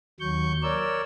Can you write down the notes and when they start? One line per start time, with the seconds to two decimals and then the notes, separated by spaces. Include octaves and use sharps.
0.20 D#2 F#3 C#6 G6
0.63 A#4 C#5 D5 E6